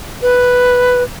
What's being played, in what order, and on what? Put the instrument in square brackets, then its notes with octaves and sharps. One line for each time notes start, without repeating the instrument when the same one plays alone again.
[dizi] B4